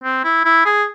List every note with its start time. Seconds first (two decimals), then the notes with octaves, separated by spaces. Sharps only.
0.04 C4
0.24 E4
0.45 E4
0.65 G#4